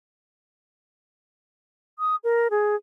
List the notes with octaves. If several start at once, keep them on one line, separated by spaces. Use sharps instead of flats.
D#6
A#4
G#4